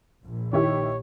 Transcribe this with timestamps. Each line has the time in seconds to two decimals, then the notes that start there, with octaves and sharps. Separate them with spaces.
0.23 A#1
0.53 D#3 E4 G4 C#5